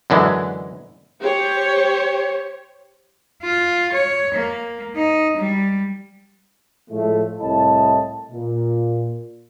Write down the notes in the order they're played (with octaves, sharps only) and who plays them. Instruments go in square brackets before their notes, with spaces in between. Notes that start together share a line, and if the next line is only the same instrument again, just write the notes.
[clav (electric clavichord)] F#2 D3 E3 G#3
[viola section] G4 C5 C#5
[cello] F4
C#5
A#3
D#4
G3
[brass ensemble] A2 F3 G#3 A3
C2 A2 E4 D#5 A5
A#2